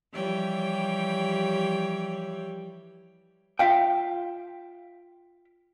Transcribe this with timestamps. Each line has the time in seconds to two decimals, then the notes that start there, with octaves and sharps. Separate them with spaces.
0.12 E3 F3 G3 G4 C#5 G5
3.59 F4 E5 F5 G5